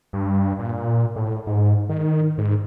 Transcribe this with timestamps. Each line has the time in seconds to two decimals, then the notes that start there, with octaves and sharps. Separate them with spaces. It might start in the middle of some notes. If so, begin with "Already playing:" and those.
0.13 G2
0.59 A#2
1.16 A2
1.47 G#2
1.89 D#3
2.38 G#2